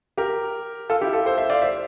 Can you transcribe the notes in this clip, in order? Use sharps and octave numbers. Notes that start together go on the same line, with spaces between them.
G4 A#4
F4 A4
E4 G4
F4 A4
A4 C5
C5 E5
D5 F5
C5 E5